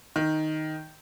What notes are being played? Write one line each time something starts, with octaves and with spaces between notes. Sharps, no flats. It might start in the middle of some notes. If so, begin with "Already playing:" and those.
D#3